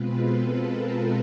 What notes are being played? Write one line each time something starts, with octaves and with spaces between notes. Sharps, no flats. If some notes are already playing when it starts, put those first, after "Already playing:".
Already playing: B2 G#3 C4 F4 B4
A4
A#4